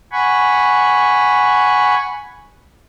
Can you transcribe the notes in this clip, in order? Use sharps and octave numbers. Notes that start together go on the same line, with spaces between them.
F#5 G#5 B5 C#6